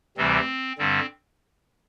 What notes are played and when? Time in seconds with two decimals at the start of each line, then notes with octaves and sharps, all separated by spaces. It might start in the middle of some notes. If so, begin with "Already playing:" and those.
0.17 D2 C3 E3 G3 C4
0.79 G2 D3 G3 C4